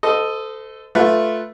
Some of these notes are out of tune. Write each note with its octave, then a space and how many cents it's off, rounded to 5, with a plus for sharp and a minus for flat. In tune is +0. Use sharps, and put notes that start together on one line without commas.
A4 +0 C5 -35 D#5 +0
A3 +0 F4 +0 B4 +0